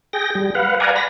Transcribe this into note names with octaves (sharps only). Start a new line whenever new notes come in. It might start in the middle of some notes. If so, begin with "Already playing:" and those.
G#4 G5 A#6
G3
B4 F5 F#5
D5 F5 F#5 G#5 A#5
B5 A#6